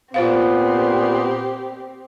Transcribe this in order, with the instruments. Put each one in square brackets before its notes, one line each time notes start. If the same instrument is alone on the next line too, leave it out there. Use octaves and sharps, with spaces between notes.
[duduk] A#2 [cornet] B3 [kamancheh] C4 G4 [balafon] F4 C5 F5